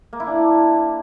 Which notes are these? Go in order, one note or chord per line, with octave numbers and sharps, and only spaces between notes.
A#3
E4
D4